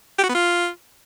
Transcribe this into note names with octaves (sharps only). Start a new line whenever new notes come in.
G4
F#4
B3
F4